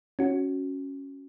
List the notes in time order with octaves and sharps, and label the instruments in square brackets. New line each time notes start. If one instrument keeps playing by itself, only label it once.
[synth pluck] C#4 F#4